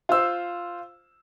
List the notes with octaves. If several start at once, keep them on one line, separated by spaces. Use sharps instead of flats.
F4 C5 E6